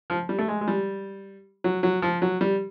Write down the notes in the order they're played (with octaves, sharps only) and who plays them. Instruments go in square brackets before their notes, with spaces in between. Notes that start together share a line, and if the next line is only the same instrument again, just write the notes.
[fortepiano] F3
G3
A3
G#3
G#3
G3
F#3
F#3
F3
F#3
G3